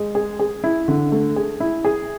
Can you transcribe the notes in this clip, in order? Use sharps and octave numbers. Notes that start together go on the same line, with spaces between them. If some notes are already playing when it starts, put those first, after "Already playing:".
Already playing: G#3
G#4
G#4
E4
D3
A3
G#4
E4
G#4